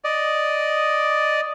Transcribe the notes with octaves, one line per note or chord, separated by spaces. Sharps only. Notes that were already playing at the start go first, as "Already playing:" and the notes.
D5 D#5